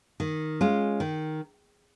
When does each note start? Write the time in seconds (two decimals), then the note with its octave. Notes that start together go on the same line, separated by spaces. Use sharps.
0.20 D#3
0.61 G#3 C#4 F4
1.00 D#3